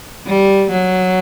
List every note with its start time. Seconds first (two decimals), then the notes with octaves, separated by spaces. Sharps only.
0.26 G3
0.71 F#3